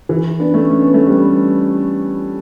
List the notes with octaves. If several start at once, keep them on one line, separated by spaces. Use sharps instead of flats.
E3
B3 D4
A3 C#4
C#4
B3
A3
G3 B3